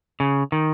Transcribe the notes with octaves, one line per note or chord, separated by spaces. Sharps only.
C#3
D#3